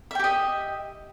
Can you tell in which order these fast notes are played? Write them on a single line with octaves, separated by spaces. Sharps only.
E5 G5 G4 D#5